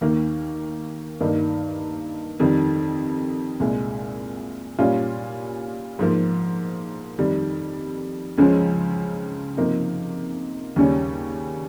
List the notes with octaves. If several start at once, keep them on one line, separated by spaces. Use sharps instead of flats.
D#2 D#3 A#3
G2 D#3 A#3 D#4
F2 D#3 G3
C2 A#2 G#3
A#2 G3 C#4 F4
G#2 F3 A#3
F2 D#3 G3
C#2 C#3 F3 G#3 C#4
C3 F3 A#3 D#4
D#2 C#3 G3 C#4